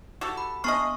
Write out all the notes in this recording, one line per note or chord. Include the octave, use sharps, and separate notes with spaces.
F#4 G4 A4
B5
B3 D4 G#4 D#5 C#6 F6